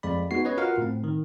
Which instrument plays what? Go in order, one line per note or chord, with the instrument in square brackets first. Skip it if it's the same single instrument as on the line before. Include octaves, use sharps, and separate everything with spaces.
[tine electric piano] F2 G#3 D5 B5
G#3 B3 D#4 F#4 C7
C#4 B4 C#5 D#5
F4 F#4 A#4 F5 F#5
A2 C4
D#3